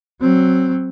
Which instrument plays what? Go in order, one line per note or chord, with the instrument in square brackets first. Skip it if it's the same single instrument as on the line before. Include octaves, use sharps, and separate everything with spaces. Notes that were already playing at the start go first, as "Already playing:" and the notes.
[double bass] F#3 C4